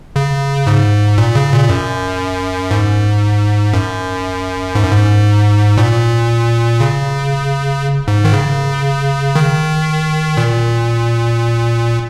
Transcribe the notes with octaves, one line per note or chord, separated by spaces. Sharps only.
C#3
G#2
A#2
C#3
A#2
F#2
G#2
F#2
G#2
F#2
G#2
A#2
C#3
G#2
D#3
C#3
D#3
A#2